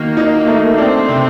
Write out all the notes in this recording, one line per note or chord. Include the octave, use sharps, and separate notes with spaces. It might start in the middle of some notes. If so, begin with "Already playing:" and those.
Already playing: D#3 A#3 F#4
D#4
A3
C4 D4
C3